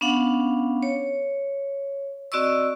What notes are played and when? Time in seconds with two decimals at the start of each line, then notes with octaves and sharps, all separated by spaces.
0.01 B3 C#4 D4 F5 F#5
0.83 C#5
2.32 C4 F#4 D5 D#5 C#6 E6